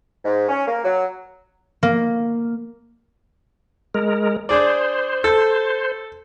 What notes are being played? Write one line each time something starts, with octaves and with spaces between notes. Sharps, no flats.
G#2
C#4
A#3
F#3
A#3
G#3 A#4
D4 G#4 C5 D5
A4